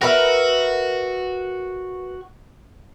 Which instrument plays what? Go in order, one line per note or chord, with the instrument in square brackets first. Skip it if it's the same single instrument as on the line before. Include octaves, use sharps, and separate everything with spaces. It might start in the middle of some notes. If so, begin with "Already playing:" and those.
[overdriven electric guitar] F#4 [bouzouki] A#4 B4 E5